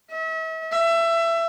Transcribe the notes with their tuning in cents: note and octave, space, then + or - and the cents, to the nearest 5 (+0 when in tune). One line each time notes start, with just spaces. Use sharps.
E5 -40
E5 +20